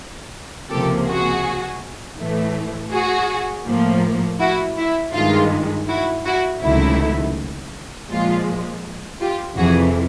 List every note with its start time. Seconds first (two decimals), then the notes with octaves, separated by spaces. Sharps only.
0.70 C#2 C3 F3 A#3 G4 A4
1.07 F#4 G#4
2.18 A2 E3 A3
2.92 F#4 G#4
3.66 A2 F3 A#3
4.40 E4 F#4
4.77 E4
5.14 G2 D#3 G#3 F4
5.88 E4 F#4
6.25 E4 F#4
6.62 C#2 C3 D#3 F#3 A3 E4
8.10 A#2 F3 G#3 F4
9.20 F4 G4
9.57 F2 C3 E3 F#4 G#4